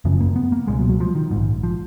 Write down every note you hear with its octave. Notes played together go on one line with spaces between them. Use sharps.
F#1 F#2 C#3 F3
A#3
B3
A#3
C#2 B2 G#3
F#3
F#3
F3
D#3
A#1 G#2
F3